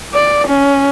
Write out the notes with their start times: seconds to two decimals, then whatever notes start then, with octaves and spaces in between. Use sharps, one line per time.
0.14 D5
0.48 C#4